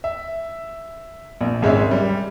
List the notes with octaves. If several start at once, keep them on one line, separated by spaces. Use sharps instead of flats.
E5
A#1
G#1 G#3 C#4 E5
G3